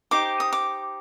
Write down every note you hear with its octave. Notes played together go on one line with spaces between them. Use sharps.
D#4 G4 C5 D6
D#6
D6